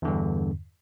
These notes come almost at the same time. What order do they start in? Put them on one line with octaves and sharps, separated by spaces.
E2 D3 G2